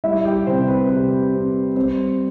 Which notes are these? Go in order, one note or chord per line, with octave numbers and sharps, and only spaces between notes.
G3 E4 E5
G4 G5
C3 C4 C5
B4
C3 B4
C4
G3 C4 C5